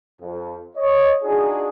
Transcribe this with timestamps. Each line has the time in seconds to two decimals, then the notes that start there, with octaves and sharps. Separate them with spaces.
0.21 F2
0.76 C#5 D#5
1.23 D4 D#4 F4 F#4 G#4